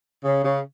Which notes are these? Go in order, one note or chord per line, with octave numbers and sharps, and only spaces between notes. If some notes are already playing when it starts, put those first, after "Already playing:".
C#3
C#3